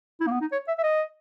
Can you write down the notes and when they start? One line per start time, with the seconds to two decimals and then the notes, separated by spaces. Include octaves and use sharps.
0.20 E4
0.27 A#3
0.31 B3
0.41 D#4
0.52 C#5
0.68 E5
0.78 E5
0.84 D#5